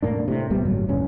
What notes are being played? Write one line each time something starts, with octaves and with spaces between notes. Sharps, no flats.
E1 A2 A#3 D4
A2 C3
C2 A#2 G3 B3
G1 A2 F#3
F#1 C#2 G2 C#4